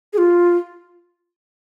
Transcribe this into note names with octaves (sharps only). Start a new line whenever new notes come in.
G#4
F4